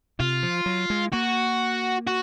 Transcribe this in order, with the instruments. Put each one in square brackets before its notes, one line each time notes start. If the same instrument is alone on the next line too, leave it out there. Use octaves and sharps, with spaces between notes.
[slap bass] C3 [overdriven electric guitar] F4
[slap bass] F3
F#3
G#3
[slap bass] A#3 [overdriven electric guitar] F#4
[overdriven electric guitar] F#4